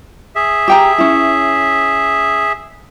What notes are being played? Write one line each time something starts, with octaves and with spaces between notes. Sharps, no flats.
G#4 E5
G4 G5 A#5
C#4 E4